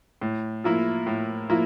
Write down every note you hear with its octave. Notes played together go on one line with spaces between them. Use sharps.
A2
F3 A#3 E4
A2
F3 A#3 E4